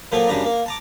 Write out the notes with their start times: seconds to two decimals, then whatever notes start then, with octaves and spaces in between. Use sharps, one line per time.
0.12 A#2 F3 F#3 A#3 A4
0.28 F#2 C#3 G3 D4 A#5
0.44 A#3
0.66 A5 A#5 D6